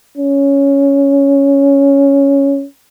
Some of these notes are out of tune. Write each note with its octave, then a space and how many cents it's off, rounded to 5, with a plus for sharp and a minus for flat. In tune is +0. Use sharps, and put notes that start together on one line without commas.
C#4 +5